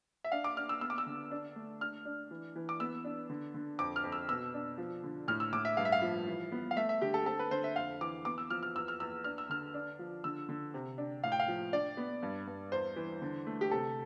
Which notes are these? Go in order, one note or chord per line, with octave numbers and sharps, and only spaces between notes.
E5
D4 F5
D6
D4 F6
E6
B3 E6
D6
E6
D3
D4
A3
D4 F6
D4
E3
E3
D6
B3 E6
D4
D3
D3
F2 D6
F6
F2
E6
B2 E6
D4
F3
D3
A2 F6
E6
A2 D6
E5
G2 F5
E5
F5
F3
E3
B3
F5
A3 E5
E5
D3 G4
A4
C4 A4
B4
D3 C5
E5
F2 F5
E3 D6
B3 D6
E6
F3 F6
F6
E2 E6
F6
E2 E6
D4 F6
E6
D3 F6
D4
F3
D3 E6
D3
C3
D4
A2 F5
G5
F5
F3
D4 D5
B3
G2
G2
E2 C5
E3
D3
A3
G4
C3 A4